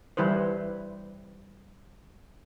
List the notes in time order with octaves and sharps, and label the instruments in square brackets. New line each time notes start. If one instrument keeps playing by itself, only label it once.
[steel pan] E3 G3 E4 B4 C5